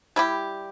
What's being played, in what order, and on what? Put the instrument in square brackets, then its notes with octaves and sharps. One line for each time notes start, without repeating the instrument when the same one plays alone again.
[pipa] G3 E4 G4